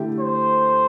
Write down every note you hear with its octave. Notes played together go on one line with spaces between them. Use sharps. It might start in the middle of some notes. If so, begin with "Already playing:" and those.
Already playing: D3 A3 E4 G4
C5